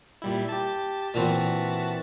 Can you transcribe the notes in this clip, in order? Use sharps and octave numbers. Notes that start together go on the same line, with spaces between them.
A#2 G3 E4
G4 A5
A#2 E3 C4 F#4 A5 B6